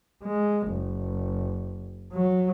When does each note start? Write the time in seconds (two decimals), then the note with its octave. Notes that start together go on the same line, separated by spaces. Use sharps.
0.24 G#3
0.70 F#1
2.13 F#3